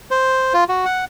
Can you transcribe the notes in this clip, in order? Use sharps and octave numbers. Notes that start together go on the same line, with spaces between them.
C5
F4
F#4
F#5